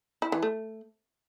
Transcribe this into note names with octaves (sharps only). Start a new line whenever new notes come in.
E4
E3
A3